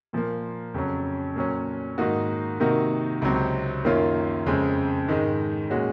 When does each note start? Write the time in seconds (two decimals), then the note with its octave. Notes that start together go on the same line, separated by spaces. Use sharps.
0.13 A#2 F3 A#3
0.74 F2 C#3 F#3 C#4
1.36 A#2 F#3 C#4
1.98 G#2 D#3 A#3 D#4 F#4
2.60 C3 D#3 A#3 D#4 F#4
3.22 C#2 C3 F#3 C4
3.84 F#2 D#3 A#3 C#4 F4
4.46 F2 C#3 G#3 C4
5.08 G#2 D#3 G#3
5.70 A#2 G#3 C#4 F#4